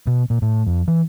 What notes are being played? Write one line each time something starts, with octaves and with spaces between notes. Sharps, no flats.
B2
A#2
A2
F2
E3